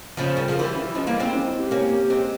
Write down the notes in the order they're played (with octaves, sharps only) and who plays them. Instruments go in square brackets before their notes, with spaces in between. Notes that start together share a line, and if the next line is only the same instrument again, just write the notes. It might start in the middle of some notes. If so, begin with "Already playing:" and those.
[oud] C#3 F3 [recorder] C5
[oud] G3 [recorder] A#4
[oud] F3 [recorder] G#4
[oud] E3 G3 [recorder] A#4
[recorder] G4
C#4
E4
[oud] F3 G#3 [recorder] C#4
[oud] G3 A#3
[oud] G#3 C4 [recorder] E4
[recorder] C#4
E4
G4
[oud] A#3 C#4
G#3 C4